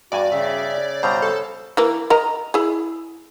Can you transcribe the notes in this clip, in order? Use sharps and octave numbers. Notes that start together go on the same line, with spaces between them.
E2 G2 F#4 D5 G#5
C#3 E5
G2 B2 G3 C5 A#5
A4
E3 A#3
A#4 D#5 A#5
E4 G#4